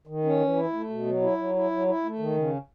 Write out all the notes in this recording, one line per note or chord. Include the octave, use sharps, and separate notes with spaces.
D#3
C#4
E3
E4
A3
B2
F#3
E4
F#3
E4
F#3
E4
A3
D#3
C#3